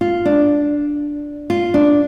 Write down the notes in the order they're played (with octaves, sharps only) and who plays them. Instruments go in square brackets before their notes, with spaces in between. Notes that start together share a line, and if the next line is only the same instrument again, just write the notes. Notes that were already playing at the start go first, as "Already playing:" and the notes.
[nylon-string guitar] F4
D4
F4
D4